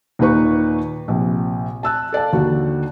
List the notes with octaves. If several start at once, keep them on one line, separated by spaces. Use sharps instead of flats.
D#2 A#2 D#4 B4 C#6
A#1 C3
A5 E6 F#6
A4 D5 F5 A5
D#2 D3 F#4